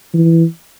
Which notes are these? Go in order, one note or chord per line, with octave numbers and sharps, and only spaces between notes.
E3